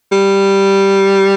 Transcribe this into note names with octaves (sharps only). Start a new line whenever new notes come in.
G3